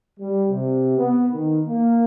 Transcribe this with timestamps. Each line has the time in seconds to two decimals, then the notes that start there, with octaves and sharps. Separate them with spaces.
0.20 G3
0.50 C3
0.98 B3
1.30 D#3
1.67 A#3